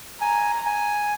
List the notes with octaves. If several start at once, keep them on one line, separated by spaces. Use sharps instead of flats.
G#5 A#5
G#5